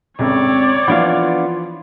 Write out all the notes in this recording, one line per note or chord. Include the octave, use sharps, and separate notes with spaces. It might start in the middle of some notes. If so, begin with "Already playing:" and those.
G1 C#2 C4 C#5 D5
E3 F3 B3 D4 F4 F5